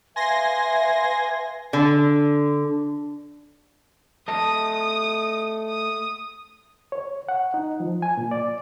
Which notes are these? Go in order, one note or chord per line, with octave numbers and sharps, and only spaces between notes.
B4 E5 F5 G#5 C6 A#6
D3
A3 D#5 A5 D#6
D#6
D#6
C#5
F#5
D#4
F3
G#5
A#2
D5